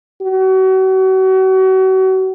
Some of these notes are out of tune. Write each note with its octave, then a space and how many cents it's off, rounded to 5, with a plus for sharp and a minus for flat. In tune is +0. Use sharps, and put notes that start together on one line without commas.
F#4 +35